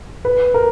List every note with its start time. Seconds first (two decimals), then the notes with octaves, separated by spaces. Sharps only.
0.25 B4
0.54 A#4